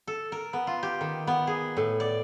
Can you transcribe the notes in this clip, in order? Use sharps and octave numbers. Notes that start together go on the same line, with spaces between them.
A4
A#4
B3
F4
G4
D#3
B3
G#4
A2
D5